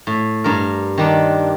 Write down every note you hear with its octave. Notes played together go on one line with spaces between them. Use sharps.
A2
G2 A#4
D#3 G3 D4